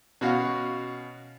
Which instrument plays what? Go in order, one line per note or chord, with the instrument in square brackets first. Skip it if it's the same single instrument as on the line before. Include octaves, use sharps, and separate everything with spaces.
[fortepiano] B2 C#4 F#4 F5